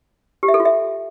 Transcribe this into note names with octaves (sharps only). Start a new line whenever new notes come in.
G4
E5
A4
F4
E5